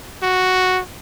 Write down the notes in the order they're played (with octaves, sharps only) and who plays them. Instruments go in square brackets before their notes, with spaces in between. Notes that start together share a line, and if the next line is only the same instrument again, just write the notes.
[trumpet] F#4